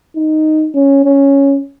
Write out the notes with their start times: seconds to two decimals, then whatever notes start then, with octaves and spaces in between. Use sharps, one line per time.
0.16 D#4
0.75 C#4
1.04 C#4